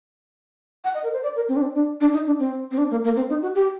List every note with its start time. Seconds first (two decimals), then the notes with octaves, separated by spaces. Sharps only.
0.84 F#5
0.94 D#5
1.04 A#4
1.13 C5
1.23 D5
1.36 A#4
1.49 C4
1.56 D4
1.62 C4
1.75 D4
2.01 D4
2.13 D#4
2.26 D4
2.39 C4
2.71 C4
2.78 D4
2.91 A#3
3.04 A#3
3.16 C4
3.30 D#4
3.42 F#4
3.55 G4